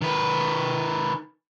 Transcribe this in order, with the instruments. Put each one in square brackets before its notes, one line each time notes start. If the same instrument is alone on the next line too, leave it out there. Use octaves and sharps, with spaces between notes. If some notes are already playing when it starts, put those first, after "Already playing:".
[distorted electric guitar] D#3 B4